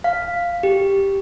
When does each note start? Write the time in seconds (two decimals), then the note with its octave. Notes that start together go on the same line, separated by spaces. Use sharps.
0.04 F5
0.63 G4